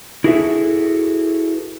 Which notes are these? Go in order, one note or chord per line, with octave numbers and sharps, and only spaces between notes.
E4 F#4 G#4 A4 B4 E5